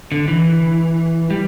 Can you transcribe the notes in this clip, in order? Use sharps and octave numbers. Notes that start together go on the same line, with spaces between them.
D3
E3
G3